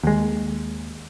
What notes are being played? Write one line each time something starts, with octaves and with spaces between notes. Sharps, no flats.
D#2 G#3